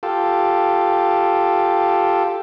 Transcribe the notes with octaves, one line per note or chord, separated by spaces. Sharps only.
F4 G4 A4